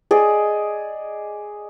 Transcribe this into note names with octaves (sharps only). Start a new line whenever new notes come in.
G#4 D5 D#5